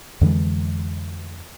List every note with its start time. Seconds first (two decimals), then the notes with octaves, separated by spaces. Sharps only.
0.21 F2 D3 E3 G#3